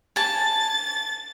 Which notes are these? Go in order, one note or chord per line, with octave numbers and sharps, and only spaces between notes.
G#5 A5 A6